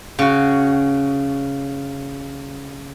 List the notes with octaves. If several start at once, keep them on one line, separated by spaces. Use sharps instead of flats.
C#3 F#4